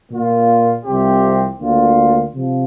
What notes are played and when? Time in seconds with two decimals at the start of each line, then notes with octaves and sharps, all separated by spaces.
0.10 A#2 A#3 F4
0.84 C2 C3 F3 C4 G4
1.60 D2 D3 A#3 F4
2.34 C3 F3